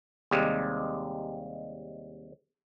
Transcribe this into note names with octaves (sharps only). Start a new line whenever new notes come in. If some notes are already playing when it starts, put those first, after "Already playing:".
D#2 C3 G3 G#3